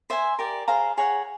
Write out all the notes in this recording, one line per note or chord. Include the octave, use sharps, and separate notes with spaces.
C5 E5 G#5
G4 A#4 D5
G#4 C5 F5 A#5
G#4 C#5 F#5 A#5